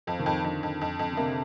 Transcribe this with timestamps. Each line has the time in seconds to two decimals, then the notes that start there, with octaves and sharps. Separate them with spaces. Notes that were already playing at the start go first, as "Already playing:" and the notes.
0.07 F2 F3
0.19 D#3
0.26 F2
0.44 F2 D3
0.63 F2
0.81 F2
0.99 F2
1.12 D3
1.17 C3 A#3